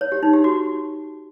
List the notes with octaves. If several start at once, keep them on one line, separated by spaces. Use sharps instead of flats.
C#5
G4
D#4
G4
F#4